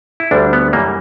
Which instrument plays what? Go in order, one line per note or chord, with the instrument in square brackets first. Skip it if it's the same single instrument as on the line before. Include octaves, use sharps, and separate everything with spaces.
[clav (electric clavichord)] E4
D2 D3 G3 D4
B3
F#2 E3 G3 A#3